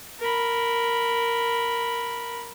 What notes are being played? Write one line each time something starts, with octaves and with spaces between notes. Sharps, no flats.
A#4 B5